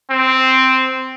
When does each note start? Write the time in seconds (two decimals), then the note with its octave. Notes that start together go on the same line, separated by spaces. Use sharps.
0.10 C4